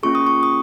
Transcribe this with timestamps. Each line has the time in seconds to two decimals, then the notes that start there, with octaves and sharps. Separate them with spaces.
0.03 A#3 C#4 F4 G#4 C#6
0.15 D#6
0.27 C#6
0.43 D#6